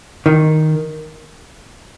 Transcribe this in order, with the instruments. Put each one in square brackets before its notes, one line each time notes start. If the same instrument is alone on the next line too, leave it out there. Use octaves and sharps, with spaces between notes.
[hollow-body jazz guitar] D#3